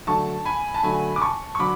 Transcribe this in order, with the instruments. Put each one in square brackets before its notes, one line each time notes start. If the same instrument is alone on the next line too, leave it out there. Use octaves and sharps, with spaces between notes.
[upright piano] D3 F#3 A3 A5 C#6
G#5 B5
A5
D3 F#3 A3 G#5 B5
D6
A5 C#6
C#6
D3 F#3 B5 D6